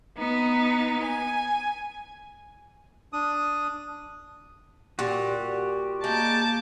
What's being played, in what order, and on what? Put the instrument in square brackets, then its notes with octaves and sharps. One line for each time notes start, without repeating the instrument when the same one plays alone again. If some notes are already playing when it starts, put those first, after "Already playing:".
[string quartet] B3 D#4
G#5
[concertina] D4 D#6
[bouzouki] A#2 G3 [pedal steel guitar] F#4 G4
[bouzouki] G#3 [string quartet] A#3 D6 G6 [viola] A5